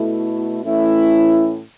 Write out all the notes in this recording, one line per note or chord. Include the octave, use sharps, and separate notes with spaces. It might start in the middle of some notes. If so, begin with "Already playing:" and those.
Already playing: B2 A3 E4
A2 E3 A3 C#4 E4